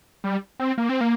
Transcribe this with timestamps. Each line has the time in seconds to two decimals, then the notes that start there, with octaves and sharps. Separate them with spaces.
0.24 G3
0.60 C4
0.78 A#3
0.89 C4
1.01 A#3